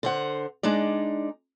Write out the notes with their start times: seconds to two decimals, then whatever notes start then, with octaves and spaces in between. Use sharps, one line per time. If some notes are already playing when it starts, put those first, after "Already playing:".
0.03 D3 C5 F#5
0.63 G#3 D4 D#4 D5